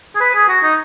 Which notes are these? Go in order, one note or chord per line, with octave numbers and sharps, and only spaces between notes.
G#4
B4
G#4
F#4
D#4